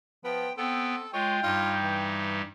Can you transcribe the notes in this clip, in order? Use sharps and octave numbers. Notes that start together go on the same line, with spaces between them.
F3 B3 G5
B3 C4 A4 G5
G#3 F4 C#5 G5
G2 G3 D#4 F4
E3